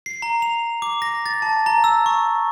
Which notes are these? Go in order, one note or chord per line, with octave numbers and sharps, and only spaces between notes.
C7
A#5
F7
D6
A#6
A6
A5
A#5
E6
C#6